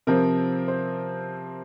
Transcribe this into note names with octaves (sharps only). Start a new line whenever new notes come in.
C3 F3 C4 A#4
C5